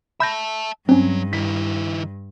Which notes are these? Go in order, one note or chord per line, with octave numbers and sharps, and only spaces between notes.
E5 A5 B5 G6 A#6
G2 F#3 C4 C#4
D#3 E4 B6